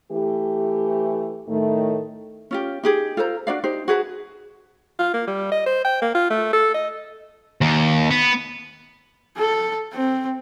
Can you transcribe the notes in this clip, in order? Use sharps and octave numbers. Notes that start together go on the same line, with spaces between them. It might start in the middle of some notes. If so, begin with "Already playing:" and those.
E3 A3 G4
A2 D#3 A3
C#4 F4 G4
D#4 G4 G#4
F4 A4 C5 A#5
D4 F#4 D5 F5
D#4 G4 C5
F#4 G#4 B4 A5
F4
A#3
G3
D#5
C5
G5
A#3
F4
A3
A4
D#5
D#2
B3
A4
C4